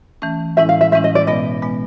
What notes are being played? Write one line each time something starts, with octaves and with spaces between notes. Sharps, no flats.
E3 A3 C#4
A2 E3 G#3 C#4 E4 E5
F5
E5
A2 E3 G#3 C#4 E4 E5
D#5
D5
B2 G#3 B3 D#5
B2 G#3 B3